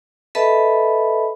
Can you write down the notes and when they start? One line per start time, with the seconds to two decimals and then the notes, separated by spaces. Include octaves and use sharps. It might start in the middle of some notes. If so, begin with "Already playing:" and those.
0.35 A4 B4 D#5 E5 A5 B5